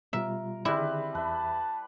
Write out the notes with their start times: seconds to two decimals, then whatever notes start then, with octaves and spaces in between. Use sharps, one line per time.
0.13 B2 G3 F4 A#4 E5
0.65 D3 D#3 G3 C4 E4 G#4 B4
1.15 E2 B4 E5 A5